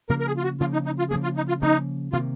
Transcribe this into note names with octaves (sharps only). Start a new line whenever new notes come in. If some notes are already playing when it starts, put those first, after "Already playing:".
C#3 F3 A#3 A#4
A#4
G#4
F4
F#4
C#3 F3 A#3 F4
D#4
D#4
F4
C#3 F3 A#3 G#4
F4
D#4
F4
C#3 F3 A#3 D#4
C3 D#3 A#3 F4